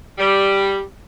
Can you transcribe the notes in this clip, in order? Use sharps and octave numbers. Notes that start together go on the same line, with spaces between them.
G3